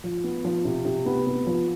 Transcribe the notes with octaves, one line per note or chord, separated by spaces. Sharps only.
F3
B3
F3
C3
C3
B3
B3
F3